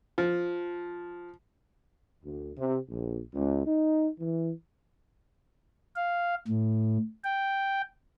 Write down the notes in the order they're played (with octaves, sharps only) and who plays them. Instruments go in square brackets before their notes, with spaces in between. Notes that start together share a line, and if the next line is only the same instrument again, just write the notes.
[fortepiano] F3
[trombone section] D2
C3
A#1
C#2
D#4
E3
[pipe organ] F5
A2
G5